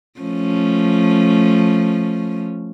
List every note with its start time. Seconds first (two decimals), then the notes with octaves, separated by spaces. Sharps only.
0.20 F3 A3 C#4